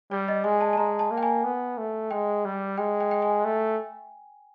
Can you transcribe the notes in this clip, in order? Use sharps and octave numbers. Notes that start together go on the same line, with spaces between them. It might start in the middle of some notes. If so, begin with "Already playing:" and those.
G3 D5
D#5
G#3 G#5
A5
A5
G#3 A#5
A5
A#3
G5
G#5
B3
A3
G#3 G5
G3
G#3 G5
G5
G5
G#5
A3